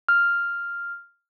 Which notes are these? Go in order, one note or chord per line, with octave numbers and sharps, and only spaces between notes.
F6